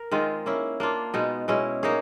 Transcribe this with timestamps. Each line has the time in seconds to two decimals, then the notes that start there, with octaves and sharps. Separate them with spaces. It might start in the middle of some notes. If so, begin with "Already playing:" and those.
Already playing: A#4
0.11 D#3 G#3 C4 F4
0.46 A#3 C#4 E4
0.80 A#3 D4 F4
1.13 B2 G#3 B3 D#4
1.48 B2 G#3 C#4 E4
1.83 A#3 D#4 G#4 C#5